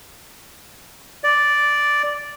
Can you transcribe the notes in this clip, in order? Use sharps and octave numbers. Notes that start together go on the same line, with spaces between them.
D5